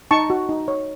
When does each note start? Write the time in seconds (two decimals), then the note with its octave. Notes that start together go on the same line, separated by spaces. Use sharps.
0.11 D#4 A5 C#6
0.30 F#4
0.49 D#4
0.68 C#5